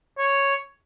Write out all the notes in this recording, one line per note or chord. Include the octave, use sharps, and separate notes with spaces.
C#5